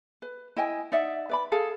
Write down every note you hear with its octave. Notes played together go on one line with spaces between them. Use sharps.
B4
E4 D#5 G5 G#5
D#4 D5 E5 F#5
B4 D5 B5
G#4 A4 F5